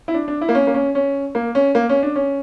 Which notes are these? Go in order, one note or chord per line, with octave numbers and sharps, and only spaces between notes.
E4
D4
D4
E4
A#3
C#4
A#3
C#4
C#4
A#3
C#4
A#3
C#4
D4
C#4